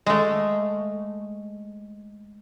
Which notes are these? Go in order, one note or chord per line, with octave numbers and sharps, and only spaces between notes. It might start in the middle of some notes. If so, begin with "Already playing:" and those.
G#3 A3